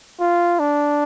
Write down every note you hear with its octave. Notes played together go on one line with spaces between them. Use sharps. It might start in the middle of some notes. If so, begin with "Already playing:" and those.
F4
D4